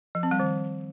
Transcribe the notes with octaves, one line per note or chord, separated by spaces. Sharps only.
F3
C4
G3
D#3